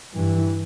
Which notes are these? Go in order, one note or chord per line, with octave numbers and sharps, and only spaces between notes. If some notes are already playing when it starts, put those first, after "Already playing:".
G2 E3